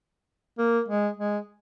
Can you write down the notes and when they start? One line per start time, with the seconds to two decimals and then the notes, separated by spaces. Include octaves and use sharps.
0.59 A#3
0.88 G#3
1.17 G#3